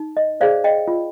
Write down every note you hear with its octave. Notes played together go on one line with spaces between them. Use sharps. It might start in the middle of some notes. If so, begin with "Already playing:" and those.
Already playing: D#4
D#5
G#4 C5 D5 F5
D#5 G5
F4